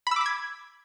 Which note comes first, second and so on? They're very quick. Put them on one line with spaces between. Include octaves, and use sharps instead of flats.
B5 E6 D6 B6 G#6